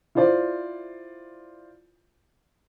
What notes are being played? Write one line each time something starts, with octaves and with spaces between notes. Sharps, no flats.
E4 F4 C5 D5